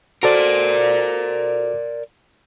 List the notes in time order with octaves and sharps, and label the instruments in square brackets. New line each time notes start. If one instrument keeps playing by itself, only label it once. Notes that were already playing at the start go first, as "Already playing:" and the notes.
[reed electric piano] F#4 A4 C5 [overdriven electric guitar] A#4 D5